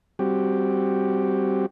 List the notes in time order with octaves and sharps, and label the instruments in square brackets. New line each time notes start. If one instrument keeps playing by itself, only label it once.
[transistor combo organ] G3 C4 F#4 G4